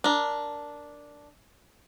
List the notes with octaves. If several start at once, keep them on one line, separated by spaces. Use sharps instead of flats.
D4 A#4